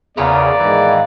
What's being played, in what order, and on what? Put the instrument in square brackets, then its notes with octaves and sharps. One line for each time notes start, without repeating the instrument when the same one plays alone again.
[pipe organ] E2 C#3 [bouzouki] A#3 B3 F4 [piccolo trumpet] D5
[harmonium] G#2 D#3 A#5 [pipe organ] E3